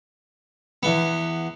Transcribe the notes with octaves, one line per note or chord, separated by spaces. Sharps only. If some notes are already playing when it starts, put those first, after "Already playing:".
E2 B3